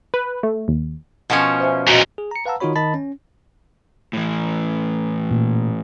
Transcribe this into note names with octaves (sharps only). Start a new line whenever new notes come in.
B4
A3
D#2
B2 F3 C#4
C5 E5 G#5
E2 A#2 F#4 D#5
G#4
A#5 C#7
B4 F5 F#5 A5 A#5 E6
D#3 D#4 F4 F#4 C#5 B5
D#3 D#5 A5 B5 A6
C#4
A2 E3
A#2